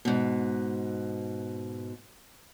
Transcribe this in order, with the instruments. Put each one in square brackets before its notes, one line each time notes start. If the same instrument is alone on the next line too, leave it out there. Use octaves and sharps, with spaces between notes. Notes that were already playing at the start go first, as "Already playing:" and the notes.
[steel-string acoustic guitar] G#2 B2